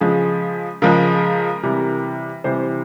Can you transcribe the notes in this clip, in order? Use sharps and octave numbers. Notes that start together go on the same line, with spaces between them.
C#3 F3 G#3 G#4
C#3 F3 G#3 A#4
C3 E3 G3
C3 E3 G3 C5